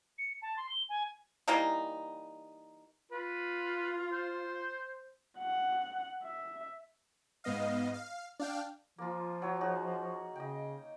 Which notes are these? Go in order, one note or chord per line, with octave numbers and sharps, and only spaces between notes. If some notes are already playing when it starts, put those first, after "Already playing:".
C#7
A5
C6
G7
G#5
E3 G3 A#3 D#4
F4 B4
C5
F#5
E5
G#2 B3 D#5 F5
F5
D4 F5 G5
F3 A#3 F4
F#3 C#5
D#4 F#4 G#4
C#3 D#5 G5